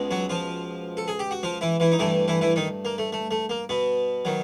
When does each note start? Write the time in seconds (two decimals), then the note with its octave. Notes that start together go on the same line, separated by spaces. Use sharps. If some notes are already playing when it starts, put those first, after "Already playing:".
Already playing: C#2 B2 G#3
0.11 F#3 F#4
0.30 F3 F4
0.97 A4
1.08 G#4
1.19 G4
1.31 F#4
1.43 F3 F4
1.61 E3 E4
1.80 E3 E4
1.92 D#4
1.99 G2 E3 A3 E4
2.28 E3 E4
2.41 E3 E4
2.56 D#3 D#4
2.85 A#3
2.98 A3
3.13 A3
3.31 A3
3.50 A#3
3.69 B2 B3
4.25 D#3 F#3